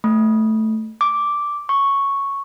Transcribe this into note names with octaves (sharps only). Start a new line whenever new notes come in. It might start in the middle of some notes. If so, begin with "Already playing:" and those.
A3
D6
C#6